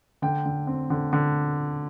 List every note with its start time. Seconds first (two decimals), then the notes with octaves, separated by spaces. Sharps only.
0.22 D3 G5
0.45 D3
0.67 C4
0.90 D3
1.13 D3